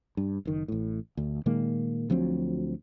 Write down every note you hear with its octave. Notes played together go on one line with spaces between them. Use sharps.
G2
F#1 D#3
A1 A2
D2
A#2 D#3 G#3 A#3
D2 F3 F#3 C4